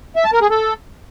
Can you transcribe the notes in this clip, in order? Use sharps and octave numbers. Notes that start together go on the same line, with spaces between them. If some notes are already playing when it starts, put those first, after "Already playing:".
E5
A5
A#4
G#4
A4